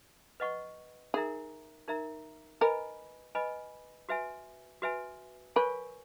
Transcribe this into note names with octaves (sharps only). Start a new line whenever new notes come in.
B4 D#5 F#5 C#6
D#4 G#4 A#4 E5 A#5
D#4 A#4 E5 A#5
A#4 B4 D#5 G#5 B5
B4 D#5 G#5 B5
F#4 B4 E5 G#5
F#4 B4 E5 G#5
A#4 B4 C#5 G#5 C#6